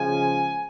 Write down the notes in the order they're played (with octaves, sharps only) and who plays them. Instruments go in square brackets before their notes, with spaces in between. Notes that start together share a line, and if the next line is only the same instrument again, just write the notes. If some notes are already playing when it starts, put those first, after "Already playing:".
Already playing: [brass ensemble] C#3 F3 G#3 G#5